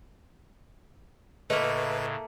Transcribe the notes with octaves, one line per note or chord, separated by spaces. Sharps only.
A2 C#3 A3 A#3 B4 D#5